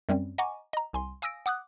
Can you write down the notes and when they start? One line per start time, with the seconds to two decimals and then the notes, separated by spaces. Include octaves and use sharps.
0.09 F#2 G3 C4 C#4
0.38 D#5 F#5 G#5 A#5 C#6 D6
0.73 D#5 A#5
0.93 C2 G#5 C6
1.22 F5 G#5 D#6 E6 A#6 D7
1.46 F#5 D6 D#6 F#6